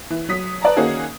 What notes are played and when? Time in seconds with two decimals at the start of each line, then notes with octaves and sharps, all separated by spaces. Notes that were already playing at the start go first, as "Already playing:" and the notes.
0.10 E3
0.29 F#3 D#6 B6
0.62 B4 D5 A5 A#5
0.77 D#3 A#3 C#4 D#4 F#4 G#4